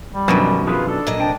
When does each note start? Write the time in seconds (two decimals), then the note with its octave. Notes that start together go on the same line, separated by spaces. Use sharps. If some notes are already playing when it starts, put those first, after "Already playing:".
0.12 G3
0.28 F#2 B2 D3 D#3 F3 F#3
0.67 E4 F4 G#4 B4
0.88 D4 A4
1.07 A#2 F#3 D#5
1.19 C3 D4 G5 A5